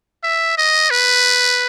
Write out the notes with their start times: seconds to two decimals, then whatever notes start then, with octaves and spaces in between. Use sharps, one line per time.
0.24 E5
0.58 D#5
0.91 B4